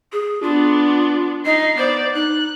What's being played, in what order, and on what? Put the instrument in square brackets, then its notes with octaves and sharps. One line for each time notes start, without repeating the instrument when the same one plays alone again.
[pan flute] G#4
[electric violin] B3 D4 [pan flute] F4
[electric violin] D#4 C7 [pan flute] D#5
[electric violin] B3 D5 [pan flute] C5
[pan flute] D#4 [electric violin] F#6